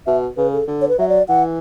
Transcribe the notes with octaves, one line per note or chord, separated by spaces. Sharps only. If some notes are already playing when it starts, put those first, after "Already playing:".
B2 E5
C#3 B4
A4
D3
C#5
B4
F#3 E5
D5
E3 F#5